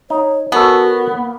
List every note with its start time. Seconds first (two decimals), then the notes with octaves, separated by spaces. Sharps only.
0.10 D#4 C#5
0.52 B3 F#4 A4 A#4 C#5 G#5
1.14 A#3